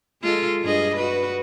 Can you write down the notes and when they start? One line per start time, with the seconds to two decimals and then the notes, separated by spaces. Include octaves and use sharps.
0.22 G#3 F4 A4
0.62 G2 G#4 D#5
0.97 F#4 B4